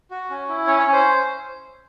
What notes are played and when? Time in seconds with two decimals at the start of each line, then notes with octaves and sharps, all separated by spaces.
0.11 F#4
0.30 C#4
0.49 E4
0.67 C#4 C#5
0.80 C#5
0.87 C#4
0.92 C5